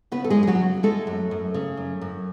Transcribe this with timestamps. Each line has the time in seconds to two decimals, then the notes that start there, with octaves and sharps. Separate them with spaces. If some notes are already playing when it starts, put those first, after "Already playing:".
0.12 C#3 B3 B4
0.24 A4
0.30 F#2 G#3 G#4
0.43 G#4
0.47 F#3 F#4
0.60 C#3
0.83 G#3 A3 A4
1.07 F#2
1.31 F#2
1.54 C#3
1.77 F#2
2.01 F#2